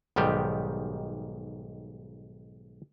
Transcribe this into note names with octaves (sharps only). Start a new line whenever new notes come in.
B1 G#2 D#3 G3 G4